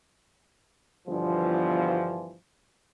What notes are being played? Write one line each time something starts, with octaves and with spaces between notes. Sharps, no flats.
G1 G2 B2 E3 F3